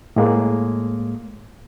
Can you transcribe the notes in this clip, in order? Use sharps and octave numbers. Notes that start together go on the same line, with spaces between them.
A2 G#3 A#3